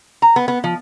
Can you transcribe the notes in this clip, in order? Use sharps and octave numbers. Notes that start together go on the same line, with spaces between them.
A#5
B3
B3
F3